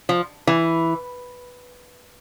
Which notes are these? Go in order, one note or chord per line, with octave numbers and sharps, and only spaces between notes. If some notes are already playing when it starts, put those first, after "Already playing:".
F3
E3